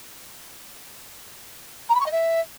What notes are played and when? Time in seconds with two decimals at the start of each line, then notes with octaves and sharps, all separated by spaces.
1.89 A#5
1.95 B5
2.00 C#6
2.06 D#5
2.12 E5